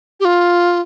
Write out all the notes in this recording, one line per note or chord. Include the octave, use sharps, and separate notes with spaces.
G4
F4